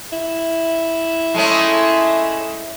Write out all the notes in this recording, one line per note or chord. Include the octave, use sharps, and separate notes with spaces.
E4
G#3 A3 C#4